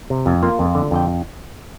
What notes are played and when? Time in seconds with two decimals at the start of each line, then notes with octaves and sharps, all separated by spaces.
0.10 C3
0.26 F2
0.43 A#3 F4
0.59 F2
0.75 D3
0.91 F2 G5